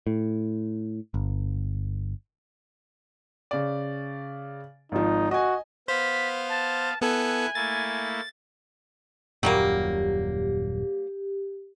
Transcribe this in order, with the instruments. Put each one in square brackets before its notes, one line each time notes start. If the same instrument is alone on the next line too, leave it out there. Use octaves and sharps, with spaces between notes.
[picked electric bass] A2
G1
[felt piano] C#3 D5
[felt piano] G#1 F3 [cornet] D#4
[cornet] F#4 [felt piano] D#5 G#5
[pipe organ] B3 F5 [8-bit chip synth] C5 [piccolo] B6
[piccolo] A5
[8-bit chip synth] B3 A4 [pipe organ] E4 F#6 [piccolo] G#5
[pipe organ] A3 A#3 E4 [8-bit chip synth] A6
[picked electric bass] D#1 F#2 A#2 [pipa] F#3 G3 A#3 [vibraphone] G4